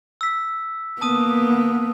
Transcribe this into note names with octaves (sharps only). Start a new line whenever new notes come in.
E6 B6
A#3 B3 A5 D#6 D#7